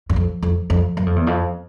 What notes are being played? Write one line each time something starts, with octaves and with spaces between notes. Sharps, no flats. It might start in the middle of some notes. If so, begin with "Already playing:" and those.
F#2
F2
F2
F2
F#2
F2
E2
F2